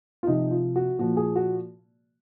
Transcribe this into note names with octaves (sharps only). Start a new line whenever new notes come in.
F4
C3 F3 D#4
F4
F#4
A#2 F3 F#4
G#4
F#4